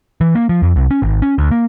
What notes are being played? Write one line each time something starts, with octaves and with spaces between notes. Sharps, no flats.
E3
A#3
F3
F2
C2
C#4
G#1
C#4
D2
A#3